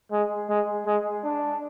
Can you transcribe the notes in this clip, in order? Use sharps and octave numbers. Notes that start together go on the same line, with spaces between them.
G#3
G#3
G#3
D4